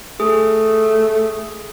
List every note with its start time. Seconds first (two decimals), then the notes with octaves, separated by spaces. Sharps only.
0.20 A3 G#4